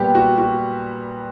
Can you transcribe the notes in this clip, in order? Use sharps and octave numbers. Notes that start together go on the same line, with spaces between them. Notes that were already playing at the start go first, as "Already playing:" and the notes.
Already playing: A#2 G3 B3 G4 B4
F#4
F#4